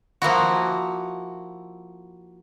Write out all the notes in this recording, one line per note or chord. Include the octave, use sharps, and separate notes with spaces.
F3 A#3 E4 F#4